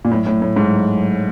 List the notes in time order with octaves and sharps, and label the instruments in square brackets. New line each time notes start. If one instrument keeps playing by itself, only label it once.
[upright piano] A#2
[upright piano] A2 [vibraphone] F#3
[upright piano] A2
[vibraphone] F#3
[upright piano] A2
[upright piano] G#2 [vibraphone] F#3
[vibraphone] F#3
C#5